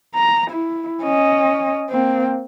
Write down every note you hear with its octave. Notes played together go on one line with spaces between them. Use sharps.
A#5
E4
C#4 D#5
A#3 C4